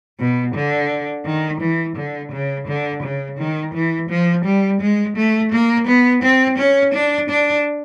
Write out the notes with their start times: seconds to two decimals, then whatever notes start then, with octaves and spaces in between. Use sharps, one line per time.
0.19 B2
0.54 D3
1.26 D#3
1.61 E3
1.96 D3
2.32 C#3
2.67 D3
3.03 C#3
3.38 D#3
3.74 E3
4.09 F3
4.45 G3
4.81 G#3
5.16 A3
5.52 A#3
5.87 B3
6.22 C4
6.58 C#4
6.94 D4
7.29 D4